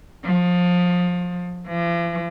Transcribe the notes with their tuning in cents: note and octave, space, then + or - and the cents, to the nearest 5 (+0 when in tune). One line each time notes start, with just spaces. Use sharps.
F3 +25
F3 -45